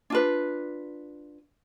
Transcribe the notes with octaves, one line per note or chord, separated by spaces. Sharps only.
D4 F4 B4